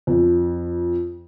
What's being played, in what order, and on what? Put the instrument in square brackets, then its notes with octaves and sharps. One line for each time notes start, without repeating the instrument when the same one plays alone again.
[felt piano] F2